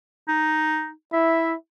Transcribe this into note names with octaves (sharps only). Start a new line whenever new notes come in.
D#4
E4 E5